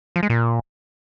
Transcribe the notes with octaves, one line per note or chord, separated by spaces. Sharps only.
F3
G#3
A#2